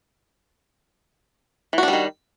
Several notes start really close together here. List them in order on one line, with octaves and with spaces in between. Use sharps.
E3 F#4 D4 G3 D#3